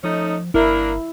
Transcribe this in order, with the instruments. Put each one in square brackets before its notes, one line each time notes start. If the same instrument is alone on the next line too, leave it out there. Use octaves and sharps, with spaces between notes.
[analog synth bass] F3 [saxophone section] A3 C#4 D#4
[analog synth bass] G1 [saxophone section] A#3 D4 A#4 [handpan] E4